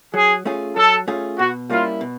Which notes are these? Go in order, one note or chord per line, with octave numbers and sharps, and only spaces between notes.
F#3 G#4
A3 C#4 F4 G#4
F#3 A4
A3 C#4 F4 G#4
B2 F#4
G3 A#3 C#4 E4 F4
B2